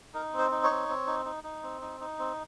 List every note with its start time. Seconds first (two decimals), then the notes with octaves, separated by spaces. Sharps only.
0.14 D#4 A#4
0.33 C4
0.39 C5
0.51 D#4
0.63 C#5
0.70 C4
0.89 C4
1.07 D#4
1.26 D#4
1.44 D#4
1.63 C4
1.82 D#4
2.00 D#4
2.19 C4